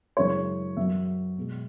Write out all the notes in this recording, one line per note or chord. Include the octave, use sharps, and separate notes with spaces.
F#2 C#3 E3 G#3 C#5
F#2 F#3 E5
B2 G#3